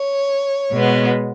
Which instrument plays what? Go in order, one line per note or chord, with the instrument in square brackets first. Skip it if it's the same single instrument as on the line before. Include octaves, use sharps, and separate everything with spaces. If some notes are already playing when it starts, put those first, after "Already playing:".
Already playing: [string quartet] C#5
B2 G#3 B3